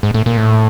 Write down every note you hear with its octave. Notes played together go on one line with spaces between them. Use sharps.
G#2
A2
A#2
A2